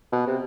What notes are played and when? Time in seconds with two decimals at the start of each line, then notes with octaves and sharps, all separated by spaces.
0.12 B2
0.27 C3